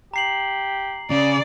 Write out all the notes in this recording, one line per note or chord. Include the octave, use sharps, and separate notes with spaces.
G4 A#5 C7 F#7
C#3 D5